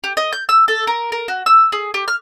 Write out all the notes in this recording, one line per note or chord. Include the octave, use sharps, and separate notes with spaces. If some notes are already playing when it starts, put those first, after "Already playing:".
G4
D#5
G6
E6
A4
A#4
A#4
F#4
E6
G#4
G4
F6